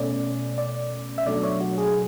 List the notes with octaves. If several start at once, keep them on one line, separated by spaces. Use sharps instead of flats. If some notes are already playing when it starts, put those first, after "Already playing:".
Already playing: B2 A3 C#4 D5
D5
E5
B2 F#3 A3 D4 D5
C#5
F#4
G#4